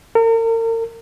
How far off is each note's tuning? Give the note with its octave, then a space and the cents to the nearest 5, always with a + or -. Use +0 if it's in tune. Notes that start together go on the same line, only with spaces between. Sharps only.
A#4 -40